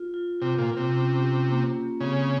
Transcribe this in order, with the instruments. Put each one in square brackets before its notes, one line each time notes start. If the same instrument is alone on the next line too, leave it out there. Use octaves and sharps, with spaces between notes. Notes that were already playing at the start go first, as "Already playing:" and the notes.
Already playing: [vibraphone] F4
F4
[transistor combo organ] C3 [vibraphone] F4
[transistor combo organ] A#2
[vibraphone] F4
[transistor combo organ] C3
[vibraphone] C#4
G4
A#3
A#3
[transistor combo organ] C#3 [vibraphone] C4